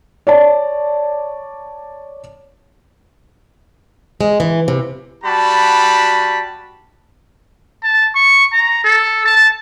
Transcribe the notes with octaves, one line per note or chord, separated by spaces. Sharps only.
C#5 D5 A5
G#3
E3
C3
G3 F#4 A5 B5
A5
C#6
A#5
A4
A5